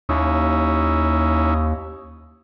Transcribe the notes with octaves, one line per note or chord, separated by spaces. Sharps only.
D#2 C#4 D#4 E4